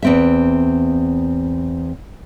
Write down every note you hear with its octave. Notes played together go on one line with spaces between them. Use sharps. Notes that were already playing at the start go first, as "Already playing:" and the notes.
E2 C4 E5